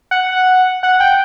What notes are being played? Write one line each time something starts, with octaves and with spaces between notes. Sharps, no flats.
F#5
F#5
G5